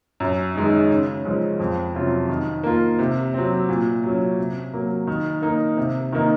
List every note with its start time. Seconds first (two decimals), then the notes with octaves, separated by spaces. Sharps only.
0.20 F#2
0.55 D#3 G#3 D#4
0.90 C#3
1.24 F3 G#3 C#4
1.60 F2
1.94 C3 F#3 C#4 F4
2.29 D#3
2.63 A#3 F4
2.99 C3
3.34 F#3 C4
3.69 A#2
4.04 F#3 C#4
4.38 C3
4.73 F#3 A#3
5.07 D#3
5.42 A#3 D#4
5.77 C3
6.12 D#3 A#3 D#4